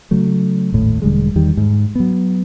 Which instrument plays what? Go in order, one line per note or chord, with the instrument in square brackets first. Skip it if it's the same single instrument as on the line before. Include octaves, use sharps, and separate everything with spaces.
[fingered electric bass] C#3 F#3 A3
D#1 G#1 A2
E1 D3 G3 G#3
E2 D#3 G3
G#2
F#3 B3